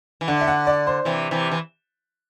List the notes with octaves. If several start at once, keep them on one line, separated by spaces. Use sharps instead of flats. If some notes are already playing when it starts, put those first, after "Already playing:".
E3
D3 F#5
E5
F#5
D5
C5
C3 E3
C3 E3
E3